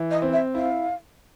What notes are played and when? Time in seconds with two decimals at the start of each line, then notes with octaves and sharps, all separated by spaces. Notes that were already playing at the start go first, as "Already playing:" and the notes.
Already playing: E3
0.11 D#5
0.22 C4
0.33 E5
0.54 E4 F5